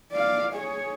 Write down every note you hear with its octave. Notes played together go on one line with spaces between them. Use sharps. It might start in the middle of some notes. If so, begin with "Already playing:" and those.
D5 F5
G#4 C#5